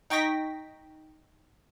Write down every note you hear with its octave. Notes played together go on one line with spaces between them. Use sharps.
D#4 G5 C#6 A#6 B6